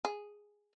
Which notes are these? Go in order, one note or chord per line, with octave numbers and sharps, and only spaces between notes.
G#4